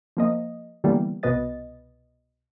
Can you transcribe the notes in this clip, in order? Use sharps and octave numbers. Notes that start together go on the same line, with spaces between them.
F3 A#3 D#5
D3 E3 G3 A#3 B3
C2 B2 B3 B4 D#5 A6